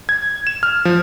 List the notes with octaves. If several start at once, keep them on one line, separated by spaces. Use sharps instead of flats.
G#6
E7
F6
F3